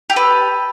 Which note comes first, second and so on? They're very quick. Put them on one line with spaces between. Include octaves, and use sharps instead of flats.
G4 A4 B4